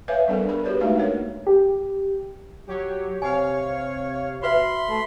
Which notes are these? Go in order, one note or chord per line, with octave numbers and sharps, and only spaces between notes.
B4 C#5 E5 F5 G#5
G3 B3 D4 A4 A#4
G#4 A#4 B5
F#4 G4 B4 C#5 D5
G#3 A3 D4 D#4 B4 F5
A#3 A#4 C#5
G4
F#3 G4 C#5
C3 C#5 F5 G#5
F#4 B4 E5 B5 C6
A3